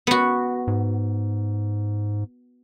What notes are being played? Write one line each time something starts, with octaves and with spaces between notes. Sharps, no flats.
B3 F#4
G#2